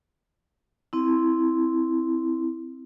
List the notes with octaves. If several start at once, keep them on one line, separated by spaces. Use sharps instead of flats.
C4 E4